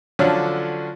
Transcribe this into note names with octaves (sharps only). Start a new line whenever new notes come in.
D3 F3 F#3 C#4 D4 A4